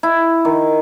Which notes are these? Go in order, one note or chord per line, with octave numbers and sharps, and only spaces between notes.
E4
D#3